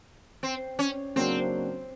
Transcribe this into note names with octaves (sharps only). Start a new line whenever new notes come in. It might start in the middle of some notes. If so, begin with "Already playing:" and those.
C4
C#4
C#3 F#3 A#3 C4 D4 F#4